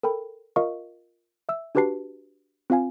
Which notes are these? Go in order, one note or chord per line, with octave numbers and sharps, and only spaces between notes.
A4 A#4 G5 B5
F4 A#4 D#5 F5 C#6
E5 E6
D4 F#4 G4 B4 A5 C7
C4 F4 F5 G#5